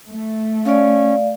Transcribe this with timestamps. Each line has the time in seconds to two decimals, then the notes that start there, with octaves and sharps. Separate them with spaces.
0.10 A3
0.65 C#4 D5 F5